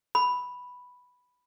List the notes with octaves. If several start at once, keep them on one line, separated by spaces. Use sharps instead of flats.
B5